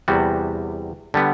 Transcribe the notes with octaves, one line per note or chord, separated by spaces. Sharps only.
E2 C3 G3 B3 F#4
D3 G3 B3